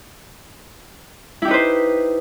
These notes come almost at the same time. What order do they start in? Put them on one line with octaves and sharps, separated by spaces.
E4 G4 D#4 B4 C5